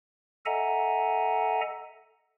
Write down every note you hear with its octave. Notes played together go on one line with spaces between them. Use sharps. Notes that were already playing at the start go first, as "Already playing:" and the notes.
A4 D#5 E5 F#5 G#5 A#5